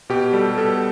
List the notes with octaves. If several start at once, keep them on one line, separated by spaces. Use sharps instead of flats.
B2 G4
G3 A4
B2 A4